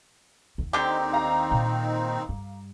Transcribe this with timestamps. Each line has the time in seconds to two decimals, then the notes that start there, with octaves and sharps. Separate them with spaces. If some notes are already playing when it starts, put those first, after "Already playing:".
0.58 D#2
0.73 D3 D#3 C4 D#4 G4
1.13 F5 A#5
1.51 A#2
2.29 G2